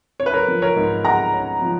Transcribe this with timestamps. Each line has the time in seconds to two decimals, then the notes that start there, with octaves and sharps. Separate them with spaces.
0.19 C#4 C#5
0.26 B4
0.34 A#4 C#5
0.48 F3
0.62 A#4 C#5
0.76 G#2
1.04 G#3 F#5 A#5
1.33 C#4
1.62 F3